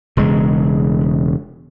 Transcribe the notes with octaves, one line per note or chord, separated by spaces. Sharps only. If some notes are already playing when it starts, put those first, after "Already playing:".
E1 C#3 G#3